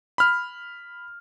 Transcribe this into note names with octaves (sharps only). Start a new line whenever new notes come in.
B5 F6